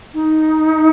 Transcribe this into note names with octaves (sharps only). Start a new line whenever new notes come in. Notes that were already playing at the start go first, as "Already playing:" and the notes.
D#4